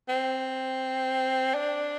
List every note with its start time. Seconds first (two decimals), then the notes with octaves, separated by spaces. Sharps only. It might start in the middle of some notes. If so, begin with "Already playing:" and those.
0.09 C4
1.55 D4